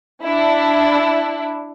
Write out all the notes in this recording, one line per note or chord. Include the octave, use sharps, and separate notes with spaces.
D4 E4